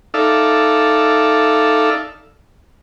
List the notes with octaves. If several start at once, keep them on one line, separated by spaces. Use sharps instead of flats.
D#4 A4 D5 E5 F5